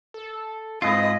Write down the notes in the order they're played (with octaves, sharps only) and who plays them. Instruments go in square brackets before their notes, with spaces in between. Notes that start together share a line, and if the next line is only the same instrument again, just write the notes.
[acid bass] A4
[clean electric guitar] G#2 F4 [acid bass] C4 [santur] E4 G#4 B4 [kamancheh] D#5